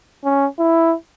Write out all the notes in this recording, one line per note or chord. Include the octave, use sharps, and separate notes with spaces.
C#4
E4